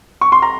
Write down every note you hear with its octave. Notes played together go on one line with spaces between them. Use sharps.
C#6
C6
A#5